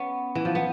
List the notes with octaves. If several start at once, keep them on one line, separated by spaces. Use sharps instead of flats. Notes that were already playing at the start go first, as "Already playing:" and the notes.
Already playing: B3 C#4
E3
F3
B3